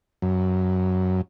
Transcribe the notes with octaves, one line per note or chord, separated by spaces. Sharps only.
F#2